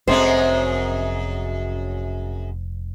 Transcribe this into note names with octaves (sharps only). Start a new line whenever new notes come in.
F1 F#2 G#3 A3 C4 C5